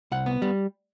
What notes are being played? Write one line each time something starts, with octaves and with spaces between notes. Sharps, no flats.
C2 F#5
B3
G3